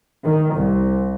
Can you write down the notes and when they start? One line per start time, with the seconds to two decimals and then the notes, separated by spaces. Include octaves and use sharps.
0.25 D#3
0.55 C2